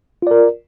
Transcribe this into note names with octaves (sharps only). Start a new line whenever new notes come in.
F4 A#4 D5